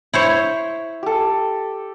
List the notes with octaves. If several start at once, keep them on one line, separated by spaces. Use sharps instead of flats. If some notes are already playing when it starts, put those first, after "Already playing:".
E4 C5 C#5
G4 A4